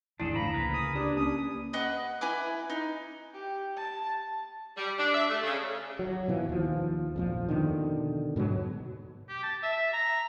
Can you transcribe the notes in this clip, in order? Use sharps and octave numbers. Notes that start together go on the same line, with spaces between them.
G#1 E2 A2 D4 E4 G#4 A4
D3 D#3 F3 A3 A#5 B5
C#2 C#3 A#3 G#4 A#4 B4
D#6
D4 G4
A#3 C#4 D#6
B4 D#5 F#5 D6
E4 B4 G#5 D6
D#4
G4
A5
G3
D4
E5
A3
C#3
F#3
B2 E3 F3
D#2 F3
F2 A#2 F3
B2 D3 D#3
G#2 B2 D#3 F#3
G4
A5
E5
A#5